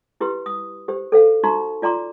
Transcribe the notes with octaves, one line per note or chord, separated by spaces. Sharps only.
E4 G4 B4 C6
D#6
G4 C5
A4 C5 F5
D#4 F#4 A#5 C6 C#6
F4 D5 A#5 C6 D6